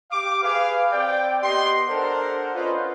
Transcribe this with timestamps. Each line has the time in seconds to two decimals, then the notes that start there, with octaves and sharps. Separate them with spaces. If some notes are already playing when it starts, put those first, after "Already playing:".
0.11 G4 F5 D6
0.43 G#4 B4 F5
0.92 C4 D5 G5
1.43 B3 G4 D#5 C6
1.88 D4 A4 A#4 C5 F#5
2.55 C#4 F4 B4 C5 D#5